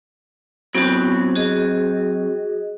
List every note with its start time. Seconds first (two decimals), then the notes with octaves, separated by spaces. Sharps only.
0.75 F#3 B3 C4 F#4
1.35 F#4 G#4 D#5